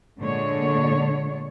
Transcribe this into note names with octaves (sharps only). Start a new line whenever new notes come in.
A#2 D3 G#3 D4 C#5